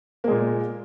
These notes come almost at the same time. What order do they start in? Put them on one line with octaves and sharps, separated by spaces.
A#3 G#3 A#2